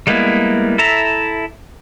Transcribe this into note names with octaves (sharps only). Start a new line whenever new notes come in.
G3 G#3 A#3 B3 E4
E4 A4 E5 A#5